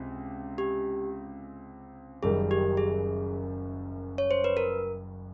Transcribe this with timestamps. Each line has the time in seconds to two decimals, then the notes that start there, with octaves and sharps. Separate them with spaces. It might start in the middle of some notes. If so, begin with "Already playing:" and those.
Already playing: C#2 C3
0.58 G4
2.23 F#1 F#2 D#3 G3 G#4
2.51 G4
2.77 G#4
4.18 C#5
4.31 C5
4.44 B4
4.57 A#4